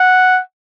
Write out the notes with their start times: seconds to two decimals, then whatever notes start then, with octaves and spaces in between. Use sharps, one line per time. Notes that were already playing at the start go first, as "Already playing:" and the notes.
Already playing: F#5